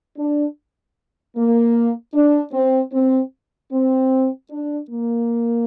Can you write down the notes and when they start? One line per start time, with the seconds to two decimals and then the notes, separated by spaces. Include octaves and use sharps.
0.17 D4
1.35 A#3
2.14 D4
2.52 C4
2.92 C4
3.71 C4
4.50 D4
4.89 A#3